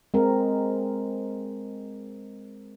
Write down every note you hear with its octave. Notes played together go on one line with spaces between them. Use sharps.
G#3 C4 A#4